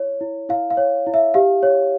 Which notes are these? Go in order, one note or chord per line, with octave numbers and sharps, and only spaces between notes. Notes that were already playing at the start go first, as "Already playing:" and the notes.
Already playing: E4 C#5
E4
E4 F5
F5
C#5
E4
E5
G4 F5
C#5